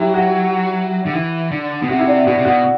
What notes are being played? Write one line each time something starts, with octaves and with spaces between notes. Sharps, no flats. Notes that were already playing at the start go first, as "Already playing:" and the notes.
Already playing: F#3 E4 G4
F#4
D3
E3
D3
B2
C3 F#4
E4
D4
B2 F#4
C3
B2 F#4